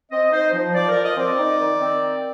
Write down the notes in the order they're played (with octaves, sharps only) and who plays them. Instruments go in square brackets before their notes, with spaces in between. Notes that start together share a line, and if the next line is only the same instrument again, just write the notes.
[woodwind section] C4 D#5
D#4 C5
F3
F3 D5
A#4
F3
D#5
C4 D5
D#4
D#3
C4